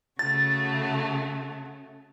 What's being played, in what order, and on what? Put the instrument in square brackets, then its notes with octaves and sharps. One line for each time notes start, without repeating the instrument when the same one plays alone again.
[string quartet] C#3 A3 F#4 [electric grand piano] A6